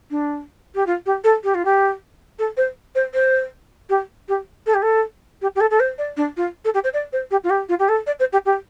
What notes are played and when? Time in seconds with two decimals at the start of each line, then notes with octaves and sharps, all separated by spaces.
0.10 D4
0.75 G4
0.86 F4
1.06 G4
1.24 A4
1.44 G4
1.54 F4
1.65 G4
2.39 A4
2.57 C5
2.95 C5
3.14 C5
3.89 G4
4.28 G4
4.66 A4
4.74 G4
4.82 A4
5.41 G4
5.55 G4
5.60 A4
5.70 A4
5.80 C5
5.98 D5
6.17 D4
6.37 F4
6.65 A4
6.74 G4
6.84 C5
6.93 D5
7.12 C5
7.31 G4
7.44 F4
7.50 G4
7.69 F4
7.79 G4
7.88 A4
8.06 D5
8.19 C5
8.32 G4
8.45 G4